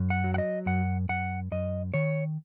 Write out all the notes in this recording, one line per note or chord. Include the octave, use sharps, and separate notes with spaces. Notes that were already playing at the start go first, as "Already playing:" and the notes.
Already playing: F#2
F#5
F#3
F#5
D#5
F#2 F#5
F#2 F#5
F#2 D#5
D#3 C#5